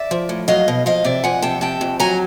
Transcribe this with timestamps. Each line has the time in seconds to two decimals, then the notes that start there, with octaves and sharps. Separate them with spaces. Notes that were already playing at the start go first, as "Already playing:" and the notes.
Already playing: D5 E5
0.11 F3
0.29 A2
0.48 F#3 D#5 F5
0.68 B2
0.86 F3 D#5 F5
1.04 C3 D5 E5
1.24 F3 F#5 G#5
1.42 C3 G5 A5
1.61 C3 G5 A5
1.81 F2
2.00 F#3 G#5 A#5